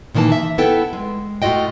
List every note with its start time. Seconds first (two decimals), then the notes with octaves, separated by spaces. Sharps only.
0.15 A#2 D#3 E3 A#3 A5
0.32 E5
0.58 B3 E4 A4 G5
0.93 G#3
1.42 A2 F4 F#4 D#5 G5